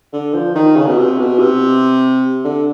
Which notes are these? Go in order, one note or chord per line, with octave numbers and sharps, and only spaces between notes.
D3
F3
D#3
C#3
B2
C3
B2
C3
D3